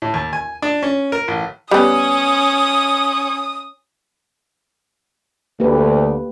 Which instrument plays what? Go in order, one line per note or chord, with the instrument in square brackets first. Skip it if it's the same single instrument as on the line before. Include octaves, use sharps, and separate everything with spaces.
[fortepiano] A2
D#2
G#5
D4
C#4
A#4
A1
[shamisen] G3 B3 [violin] C#4 [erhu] D#6
[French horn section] D2 [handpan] A#3 G4 B4